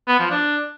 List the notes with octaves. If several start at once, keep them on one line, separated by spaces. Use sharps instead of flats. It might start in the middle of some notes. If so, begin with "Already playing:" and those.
B3
F3
D4